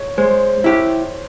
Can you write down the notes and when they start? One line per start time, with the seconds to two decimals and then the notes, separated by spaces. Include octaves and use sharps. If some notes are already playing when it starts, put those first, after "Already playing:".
Already playing: C#5
0.17 G#3 C5
0.64 E4 G4